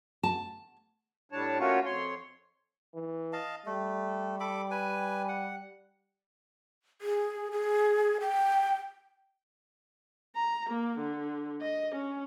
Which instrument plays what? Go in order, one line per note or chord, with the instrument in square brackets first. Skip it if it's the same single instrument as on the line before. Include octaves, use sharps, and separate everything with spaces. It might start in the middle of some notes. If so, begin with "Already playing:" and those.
[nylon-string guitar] A5
[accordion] A2 G3 D4 C#5 A5
A3 A#3 C#4 F4 F#4 C#5
F2 C#5 C6
[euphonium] E3
[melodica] D#5 F5 A5
[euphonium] G3 [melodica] A3
[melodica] A4 B5 D6
B4 G#5
F#5
[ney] G#4
G#4
G5
[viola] A#5
A#3
D3
D#5
C#4